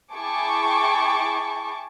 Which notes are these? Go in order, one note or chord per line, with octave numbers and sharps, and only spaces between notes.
E4 G#4 G5 A5 C#6 D6